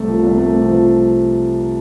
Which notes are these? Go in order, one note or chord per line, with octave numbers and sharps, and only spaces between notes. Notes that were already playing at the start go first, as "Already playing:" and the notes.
Already playing: C2 C3 A3
F3
C2
A3
C3
F3